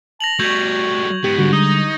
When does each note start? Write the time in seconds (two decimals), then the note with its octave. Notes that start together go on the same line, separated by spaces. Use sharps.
0.20 A5 A#6 F7 F#7
0.39 G3 A3 F#4 C#6 G6 G#6
1.24 G#2 B3 G4
1.38 D3 G3 G#3 F#4
1.53 D#4 D#6